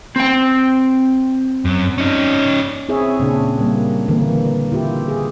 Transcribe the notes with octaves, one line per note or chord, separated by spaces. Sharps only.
C4 G5
F#2
C#4 D#4
C4 E4 G#4 C#5 E5
A#2 C#3 D4 G#4
G3 A#3
D3 E3 A#3
E4 F4 G4
G#4